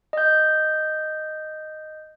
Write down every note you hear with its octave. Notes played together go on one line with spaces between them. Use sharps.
D#5 G6